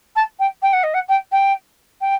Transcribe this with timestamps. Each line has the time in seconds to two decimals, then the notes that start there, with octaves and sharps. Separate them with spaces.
0.15 A5
0.39 G5
0.62 G5
0.73 F#5
0.83 D#5
0.94 F#5
1.08 G5
1.31 G5
2.01 G5